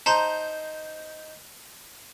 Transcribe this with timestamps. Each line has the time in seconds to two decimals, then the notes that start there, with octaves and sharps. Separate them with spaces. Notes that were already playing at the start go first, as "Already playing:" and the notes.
0.06 D#4 C5 A5 A#5 C6